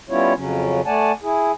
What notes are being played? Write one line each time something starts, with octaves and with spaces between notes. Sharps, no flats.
G3 B3 C#4 E4 F4 C#5
F2 C#3 F#3 C#4
A3 D5 F#5 G#5 A5
E4 G#4